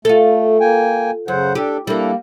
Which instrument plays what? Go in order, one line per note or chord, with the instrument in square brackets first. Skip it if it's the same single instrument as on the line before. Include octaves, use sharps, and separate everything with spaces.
[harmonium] A3 [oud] F4 A4
[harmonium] A#3 G5 G#5
[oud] F#2 [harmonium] C#3 C5 F#5
[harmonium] D4 A4 [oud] G4
[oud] G3 A#3 [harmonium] D4 E4 A4